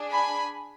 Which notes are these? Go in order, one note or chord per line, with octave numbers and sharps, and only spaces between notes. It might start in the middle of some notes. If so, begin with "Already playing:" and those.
Already playing: D4 G#4
G#5 B5